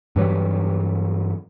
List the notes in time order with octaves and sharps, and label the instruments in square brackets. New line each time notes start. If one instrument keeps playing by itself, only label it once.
[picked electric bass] G2 E3 F#3 G3